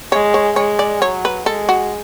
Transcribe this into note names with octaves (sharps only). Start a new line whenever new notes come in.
G#3 C#5
C#5
G#3 C#5
D5
F#3 C#5
B4
G#3 A4
F#4